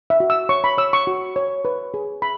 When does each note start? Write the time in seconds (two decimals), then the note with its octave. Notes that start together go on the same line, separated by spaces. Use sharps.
0.10 E5
0.20 F#4
0.30 E6
0.49 C#5 C#6
0.64 B5
0.78 C#5 E6
0.93 C#6
1.07 F#4
1.36 C#5
1.65 B4
1.94 G#4
2.22 B5